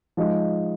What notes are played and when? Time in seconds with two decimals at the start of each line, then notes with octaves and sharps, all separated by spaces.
0.17 F3 G#3 D#4